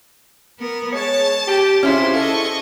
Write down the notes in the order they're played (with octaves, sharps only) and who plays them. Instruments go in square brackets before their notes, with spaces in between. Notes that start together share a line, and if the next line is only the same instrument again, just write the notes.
[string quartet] B3 A#4
[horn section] G#3 C#5 [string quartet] A5
[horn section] G4
[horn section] C3 F4 [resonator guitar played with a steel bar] C#4 E4 G#4 [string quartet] C5
[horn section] A4 [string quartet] D#5 C#6